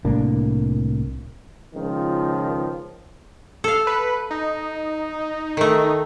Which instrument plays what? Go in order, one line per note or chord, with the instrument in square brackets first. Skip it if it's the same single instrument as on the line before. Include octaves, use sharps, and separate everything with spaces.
[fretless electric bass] C2 A2 A#3 D4
[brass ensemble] C#2 D#3 F3
[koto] A4 F5
[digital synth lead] B4
D#4
[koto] D#3 A3